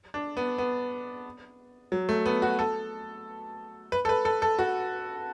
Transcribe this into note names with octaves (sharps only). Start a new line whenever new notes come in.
D4
B3
B3
F#3
A3
B3
F#4
A4
B4
A4
B4
A4
A4
F#4